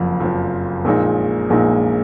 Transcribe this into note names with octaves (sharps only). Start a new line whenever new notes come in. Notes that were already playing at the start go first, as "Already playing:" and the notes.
Already playing: F#1 F2 F3
F#1 F2 F3
A#1 A#2 G#3 D#4
A#1 A#2 G#3 D#4